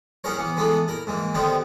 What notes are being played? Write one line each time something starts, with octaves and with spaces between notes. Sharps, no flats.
B3 C#4 E4 G#4 A#4 C#5
E3 B3
E3 G#3 A3 B3 E4
E4 A#4
G#2 E3 A#3
D3 D#3 B3 C4 D#4 G4